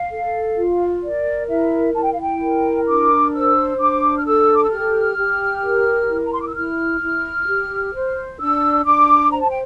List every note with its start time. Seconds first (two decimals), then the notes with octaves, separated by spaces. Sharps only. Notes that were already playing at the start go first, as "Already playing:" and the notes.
Already playing: F5
0.11 A4
0.56 F4
1.03 A#4 D5
1.49 E4 E5
1.94 E4 A5
2.03 G5
2.12 F5
2.20 G5
2.41 A#4
2.86 D4 D6
3.33 C5 E6
3.79 D4 D6
4.17 F6
4.25 A4 E6
4.55 D6
4.63 E6
4.71 G4 F6
5.17 G4
5.63 A#4
6.09 E4
6.25 A#5
6.32 C6
6.40 D6
6.47 E6
6.55 E4 F6
7.01 E4
7.47 G4
7.93 C5
8.39 D4 E6
8.85 D4 D6
9.31 C5 A#5
9.41 A5
9.49 G5